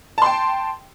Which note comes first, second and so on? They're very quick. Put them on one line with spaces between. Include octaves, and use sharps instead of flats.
A5 C6 G5